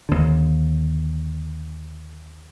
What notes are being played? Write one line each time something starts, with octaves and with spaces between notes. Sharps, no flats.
D#2 D3